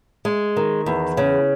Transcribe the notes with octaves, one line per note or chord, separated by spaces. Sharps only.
G#3
D#3
E2
C#3